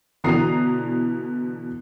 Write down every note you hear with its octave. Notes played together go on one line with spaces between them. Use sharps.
B2 D3 E3 A#5 D#6 C7